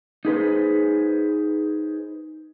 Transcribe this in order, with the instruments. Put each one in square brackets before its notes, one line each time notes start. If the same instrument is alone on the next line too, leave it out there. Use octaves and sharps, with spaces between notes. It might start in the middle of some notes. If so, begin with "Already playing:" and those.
[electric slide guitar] D#4 G#4 B4 C5